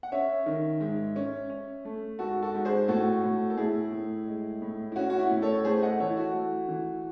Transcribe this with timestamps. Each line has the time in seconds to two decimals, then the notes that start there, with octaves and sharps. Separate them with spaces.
0.03 F#5
0.12 C#4 C#5 E5
0.46 D#3
0.80 G#2
1.16 C#4
1.50 C#4
1.85 A3
2.19 G#2 F#4 A4
2.42 F#4 A4
2.55 G#2
2.65 G#4 C5
2.88 A2 F#4 A4
3.24 A2
3.50 A4
3.57 A2 E4 G#4
3.92 A2
4.27 G#3
4.62 A2
4.92 E4
4.96 C#4 F#4
5.10 F#4
5.19 E4
5.31 A2
5.42 A4 C#5
5.65 A3 G#4 C5
5.82 D#5 F#5
6.00 E3 A4 C#5
6.11 E4
6.17 F#4
6.34 A3
6.69 E3